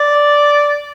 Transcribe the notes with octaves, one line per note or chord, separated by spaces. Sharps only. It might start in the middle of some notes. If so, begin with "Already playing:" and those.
Already playing: D5